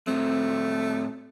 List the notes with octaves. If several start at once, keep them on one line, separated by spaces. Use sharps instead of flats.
A2 A3 C4